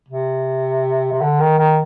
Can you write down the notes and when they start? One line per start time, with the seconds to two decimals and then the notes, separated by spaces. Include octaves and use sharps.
0.09 C3
1.12 C3
1.21 D3
1.40 D#3
1.59 D#3